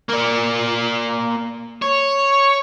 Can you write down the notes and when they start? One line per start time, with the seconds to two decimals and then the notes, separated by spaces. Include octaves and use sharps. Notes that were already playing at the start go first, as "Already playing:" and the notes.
0.09 A#3 D5
1.82 C#5